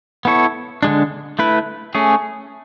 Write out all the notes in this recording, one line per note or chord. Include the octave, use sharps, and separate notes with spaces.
B3 E4 A4 C#5
D3 G#3 D4
A3 E4 B4
A3 C#4 G#4